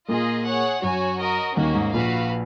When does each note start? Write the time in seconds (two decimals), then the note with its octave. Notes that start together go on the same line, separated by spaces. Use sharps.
0.08 A#2 A#3 F4 G#4 D#5
0.46 G#4 C#5 F#5
0.82 F#2 F#3 F#4 C#5 G#5
1.20 F#4 A#4 D#5
1.56 D#2 D#3 A#3 C#4 F#4
1.74 G#2
1.93 A#1 A#2 F#4 B4 F5